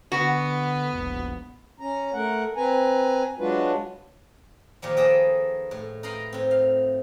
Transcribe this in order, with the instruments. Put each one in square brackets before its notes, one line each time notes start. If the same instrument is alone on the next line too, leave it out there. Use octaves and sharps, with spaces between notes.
[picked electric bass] D3 [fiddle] B3 [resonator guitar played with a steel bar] F#4
[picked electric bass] E1 A#1
[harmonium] C#4 A#5
A3 A#4 F#5
C4 B4 G#5 A#5
F#3 G#3 D4 F4 F#4 B4
[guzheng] A#2 D#3 F3 G3
G#4 A4 B4 D#5 G5 A5
A2
D#4 B4 D#5 F5 G5 C6
A2 C4
F5